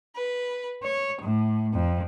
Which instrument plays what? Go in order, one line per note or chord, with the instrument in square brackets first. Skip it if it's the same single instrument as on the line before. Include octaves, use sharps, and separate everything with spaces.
[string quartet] B4
C#5
A2
F2